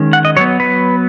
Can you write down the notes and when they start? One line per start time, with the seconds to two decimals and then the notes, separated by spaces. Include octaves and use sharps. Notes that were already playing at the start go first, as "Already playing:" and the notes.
Already playing: D#3 G#3 C#4
0.13 F#5
0.25 D#5
0.37 F#3 B3 C#5
0.60 B4